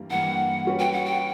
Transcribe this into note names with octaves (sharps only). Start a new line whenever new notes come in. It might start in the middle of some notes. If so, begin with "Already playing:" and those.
Already playing: G2 E3 G3 A#3
G2 E3 G3 A#3 F#5
G3 C#4 F#4 B4
G5
F#5
G5